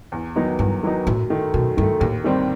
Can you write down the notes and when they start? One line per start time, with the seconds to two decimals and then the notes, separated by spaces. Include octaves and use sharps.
0.12 E2
0.36 D#3 F#3 B3 D#4
0.59 E2 G2
0.83 D#3 F#3 B3 D#4
1.07 F#2 A2
1.30 D#3 A3
1.54 F#2 B2
1.77 G2 D#3
1.81 A3
2.00 D#2 A2
2.24 D#3 G3 C4